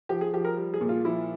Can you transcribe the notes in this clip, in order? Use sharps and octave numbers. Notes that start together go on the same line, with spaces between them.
F3 G4
G#4
F3 G4
A#4
G3
G#4
A#2
F4
F3 E4